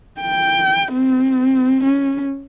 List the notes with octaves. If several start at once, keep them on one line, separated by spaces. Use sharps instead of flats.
G5
C4
C#4